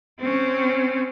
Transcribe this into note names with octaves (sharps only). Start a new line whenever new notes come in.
C4 C#4